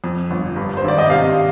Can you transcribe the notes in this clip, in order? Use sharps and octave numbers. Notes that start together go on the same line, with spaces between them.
F2
G1
G2
C5
G#1 D5
D#5
C3 F5